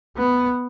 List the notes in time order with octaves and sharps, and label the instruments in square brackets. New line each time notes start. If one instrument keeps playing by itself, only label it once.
[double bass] B3